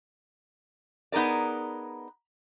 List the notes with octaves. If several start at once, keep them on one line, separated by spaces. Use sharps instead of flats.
B3 D#4 G#4 A#4 D5